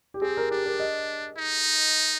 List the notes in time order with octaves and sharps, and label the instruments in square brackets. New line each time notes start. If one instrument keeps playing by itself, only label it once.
[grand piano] G4
[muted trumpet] C4 [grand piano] G#4
[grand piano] A#4
[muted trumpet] D4 [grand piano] G4
[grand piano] A#4
D#5
[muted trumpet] D#4